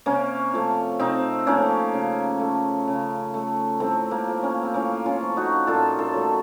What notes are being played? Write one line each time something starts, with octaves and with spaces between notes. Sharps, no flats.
C3 A#3 C#4
F3 A3
C3 C4 D#4
F3 A3 A#3 C#4
C#3
A3
C#3
A3
A2 A3 C4
A#3
F3 A3
A#3 C#4
C4
A2 A#3 C#4
C#4 F4
F3 A3
D#4 F#4
A#2 F4 A4
F4 A4
F#3 A3